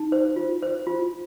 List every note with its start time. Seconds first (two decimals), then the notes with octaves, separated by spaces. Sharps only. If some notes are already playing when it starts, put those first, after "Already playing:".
Already playing: D#4
0.12 C5
0.36 F4
0.63 C5
0.87 F4